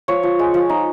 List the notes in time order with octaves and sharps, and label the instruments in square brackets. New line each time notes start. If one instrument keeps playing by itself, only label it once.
[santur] F3 C#5
F3
G#3
F3
D#4